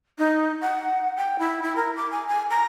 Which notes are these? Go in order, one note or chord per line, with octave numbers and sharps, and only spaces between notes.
D#4
F#5
G5
E4
E4
A#4
D6
G#5
G#5
A#5